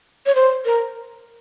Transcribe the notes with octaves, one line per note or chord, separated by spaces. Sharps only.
C#5
C5
A#4